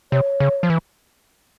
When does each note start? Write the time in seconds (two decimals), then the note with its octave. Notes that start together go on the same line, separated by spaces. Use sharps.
0.12 C3 C#5
0.40 C#3
0.63 F3
0.70 E3